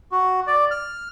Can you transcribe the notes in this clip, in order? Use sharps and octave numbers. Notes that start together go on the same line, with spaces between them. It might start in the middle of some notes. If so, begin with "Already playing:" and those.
F#4
D5
F6